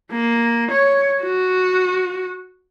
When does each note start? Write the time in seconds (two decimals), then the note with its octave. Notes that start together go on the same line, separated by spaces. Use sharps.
0.11 A#3
0.71 C#5
1.22 F#4